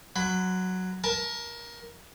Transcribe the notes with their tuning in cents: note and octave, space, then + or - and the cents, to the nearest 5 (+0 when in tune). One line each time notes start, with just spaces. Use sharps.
F#3 +0 B5 +30
A#4 +20 A5 -5